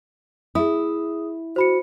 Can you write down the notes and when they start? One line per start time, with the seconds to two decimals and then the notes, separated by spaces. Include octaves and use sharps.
0.55 E4 G#4 D#6
1.56 F#4 C5 B5 C#7